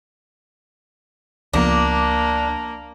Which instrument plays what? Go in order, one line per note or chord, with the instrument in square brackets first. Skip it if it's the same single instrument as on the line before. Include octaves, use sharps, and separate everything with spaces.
[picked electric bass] C#2 F3 B3 [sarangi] A#3 [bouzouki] D4